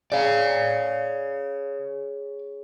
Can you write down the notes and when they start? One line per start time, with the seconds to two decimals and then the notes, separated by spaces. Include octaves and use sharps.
0.12 C#3 D5 F5